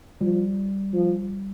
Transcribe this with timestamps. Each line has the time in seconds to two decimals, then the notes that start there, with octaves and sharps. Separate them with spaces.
0.21 F3 G3
0.93 F3